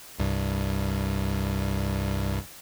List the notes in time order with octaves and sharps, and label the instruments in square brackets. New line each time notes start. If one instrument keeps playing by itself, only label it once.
[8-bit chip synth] C2 G2